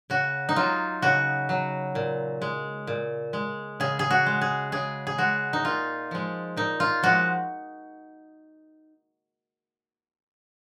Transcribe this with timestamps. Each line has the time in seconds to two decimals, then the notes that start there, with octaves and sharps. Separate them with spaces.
0.10 C#3 F#4
0.49 D#4
0.56 F#3 F4
1.02 C#3 F#4
1.49 F#3
1.95 A#2
2.42 G#3
2.87 A#2
3.33 G#3
3.80 C#3 G#4
3.99 G#4
4.10 F#4
4.26 G#3
4.41 G#4
4.72 C#3 G#4
5.07 G#4
5.18 G#3 F#4
5.53 D#4
5.64 A#2 F4
6.11 F3 G#3
6.57 A#2 D#4
6.80 F4
7.03 F3 G#3 F#4